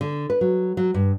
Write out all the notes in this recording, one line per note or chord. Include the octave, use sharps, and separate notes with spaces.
D3
B4
F#3
F#3
G2